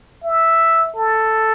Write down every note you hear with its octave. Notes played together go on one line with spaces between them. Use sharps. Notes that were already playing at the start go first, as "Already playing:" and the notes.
E5
A4